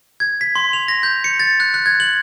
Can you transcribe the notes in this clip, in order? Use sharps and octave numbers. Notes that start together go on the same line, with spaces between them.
G#6
B6
C6
F7
A#6
G6
C#7
A6
F#6
F#6
G#6
F#7